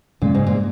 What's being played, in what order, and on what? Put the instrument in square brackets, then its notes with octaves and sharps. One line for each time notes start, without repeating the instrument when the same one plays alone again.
[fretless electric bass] F#2 C#3 G#3 [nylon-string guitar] A#2
[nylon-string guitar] G#2
A#2